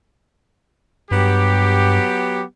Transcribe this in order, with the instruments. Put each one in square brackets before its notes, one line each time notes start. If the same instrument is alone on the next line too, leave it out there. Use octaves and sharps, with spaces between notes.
[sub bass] G2 [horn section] F#3 B3 G4